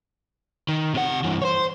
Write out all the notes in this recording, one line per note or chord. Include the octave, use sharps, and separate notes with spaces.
D#3
C3 F#5
G2 E3
C5 C#5